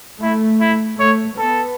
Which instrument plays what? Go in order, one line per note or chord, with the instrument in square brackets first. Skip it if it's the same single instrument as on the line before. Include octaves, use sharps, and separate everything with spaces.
[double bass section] A3 [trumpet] E4
[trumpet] E4
[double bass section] A3 [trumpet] C#5
[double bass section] B3 [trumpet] A4